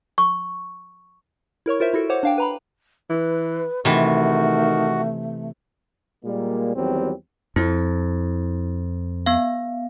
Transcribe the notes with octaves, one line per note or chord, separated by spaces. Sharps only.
C#6
E4 A#4 C#5 C#6
F4 A#4 C5 E5
E4 F#4 A4
C5 C#5 F#5 D6
D4 F5 G5
B4 A#5 B5
E3 B4
C3 D#3 E3 A3 F#4
A#2 G3 G#3 A#3
E2 D#3 F#3 G3 C4
F2 E4
B3 F5